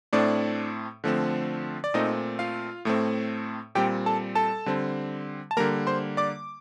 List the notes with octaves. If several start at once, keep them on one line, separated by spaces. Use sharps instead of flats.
A2 A3 C4 D4 D5
D3 F3 A3 C4
D5
A#2 A3 C4 D#4 D#5
F4 F5
A2 A3 C4
A#2 G3 C4 G4 G5
A4 A5
A4 A5
D3 G3 C4
A5
D3 G3 A#3 A#4 A#5
C5 C6
D5 D6